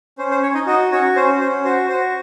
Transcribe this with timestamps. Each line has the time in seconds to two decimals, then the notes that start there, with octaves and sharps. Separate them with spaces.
0.18 C#4 C5
0.31 C5
0.42 C#4 C#5
0.54 D#4 D#5
0.67 D#4 F#4 D#5
0.91 C#4 F#4 C#5
1.16 C#4 C5
1.41 C#4 C5
1.65 F#4 C5
1.89 F#4 C5